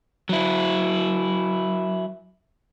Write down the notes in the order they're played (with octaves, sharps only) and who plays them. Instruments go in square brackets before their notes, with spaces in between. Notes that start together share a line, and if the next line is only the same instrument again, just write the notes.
[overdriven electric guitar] F#3 E4